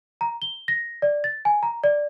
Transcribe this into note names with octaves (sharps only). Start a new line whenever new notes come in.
A#5
G7
A#6
D5
A6
G#5
A#5
D5